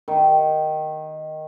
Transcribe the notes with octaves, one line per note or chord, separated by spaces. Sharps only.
D#3